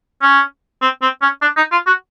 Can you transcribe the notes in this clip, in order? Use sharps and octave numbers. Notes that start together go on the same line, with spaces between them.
C#4
C4
C4
C#4
D4
D#4
F4
F#4